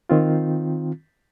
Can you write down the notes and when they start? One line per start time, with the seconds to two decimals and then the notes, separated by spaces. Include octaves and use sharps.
0.10 D#3 C4 F4